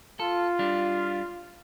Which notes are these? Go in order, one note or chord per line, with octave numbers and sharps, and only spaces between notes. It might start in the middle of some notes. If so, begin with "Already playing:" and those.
F4 A4
G3 D4